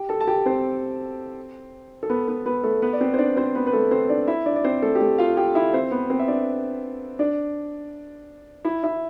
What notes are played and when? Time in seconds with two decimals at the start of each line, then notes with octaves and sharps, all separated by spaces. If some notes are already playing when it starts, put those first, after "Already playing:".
Already playing: G4 G5
0.09 A4 A5
0.20 A5
0.27 G4 G5
0.46 C4 C5
2.03 A4
2.09 B3 B4
2.28 B3 B4
2.46 B3 B4
2.64 A3 A4
2.82 B3 B4
2.93 D5
3.01 C4 C5
3.14 C5
3.18 D4 D5
3.37 C4 C5
3.55 B3 B4
3.67 B4
3.73 A3 A4
3.91 C4 C5
4.09 D4 D5
4.28 E4 E5
4.46 D4 D5
4.56 D5
4.64 C4 C5
4.82 A3 A4
4.95 G4
5.01 A3 A4
5.18 F4 F5
5.37 G4 G5
5.55 E4 E5
5.73 C4 C5
5.91 B3 B4
6.10 C4 C5
6.19 E5
6.28 D4 D5
7.19 D4 D5
8.65 E4 E5
8.83 E4 E5